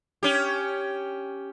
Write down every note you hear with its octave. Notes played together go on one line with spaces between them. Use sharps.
C#4 G4